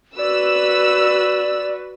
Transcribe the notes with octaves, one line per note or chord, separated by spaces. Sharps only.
F#4 B4 D5 E6